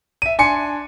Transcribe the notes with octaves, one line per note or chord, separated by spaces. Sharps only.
E5 D#7
D4 G#5 C6 C#7